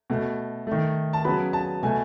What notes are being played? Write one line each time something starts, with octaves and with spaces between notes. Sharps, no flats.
B2 A3
D#3 A3
A5
C#3 F#3 B3 B5
A5
B2 A3 G#5